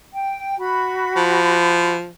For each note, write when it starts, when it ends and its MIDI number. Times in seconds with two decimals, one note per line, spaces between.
0.13 0.55 79
0.59 1.95 66
0.59 1.95 83
1.16 2.09 53